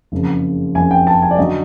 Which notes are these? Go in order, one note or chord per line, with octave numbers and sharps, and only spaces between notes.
F#1 F2 C#3
F#1 F2 C#3 G#5
G5
A5
G#5
D5
D3 F#3 D#5